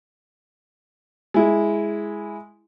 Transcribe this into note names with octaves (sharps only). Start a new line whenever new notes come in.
G#3 E4